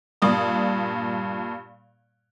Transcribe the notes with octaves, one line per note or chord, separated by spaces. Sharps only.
G2 A#2 D5 D#6